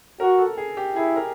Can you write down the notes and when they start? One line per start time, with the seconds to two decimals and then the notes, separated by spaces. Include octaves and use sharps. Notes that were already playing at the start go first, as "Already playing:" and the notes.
0.20 F#4 A#4
0.39 A4
0.57 G#4
0.77 G4
0.95 E4 G#4
1.16 A#4